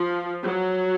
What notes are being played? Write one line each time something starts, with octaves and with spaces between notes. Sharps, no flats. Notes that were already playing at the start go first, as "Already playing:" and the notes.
Already playing: F3
F#3